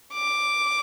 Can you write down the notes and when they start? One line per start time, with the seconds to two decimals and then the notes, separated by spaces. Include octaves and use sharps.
0.14 D6